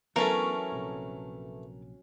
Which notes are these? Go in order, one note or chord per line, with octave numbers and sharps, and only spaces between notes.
E3 F#3 A3 B3 C#4 D4 A#4 A5
A#1 C3